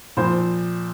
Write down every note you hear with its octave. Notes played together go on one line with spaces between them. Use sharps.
A#2 F3 C5